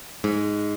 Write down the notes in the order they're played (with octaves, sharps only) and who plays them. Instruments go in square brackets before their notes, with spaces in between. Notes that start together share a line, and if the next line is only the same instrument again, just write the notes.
[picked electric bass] G#2